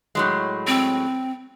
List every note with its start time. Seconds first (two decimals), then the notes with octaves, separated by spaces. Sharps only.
0.15 A2 F#3 G#3
0.67 C4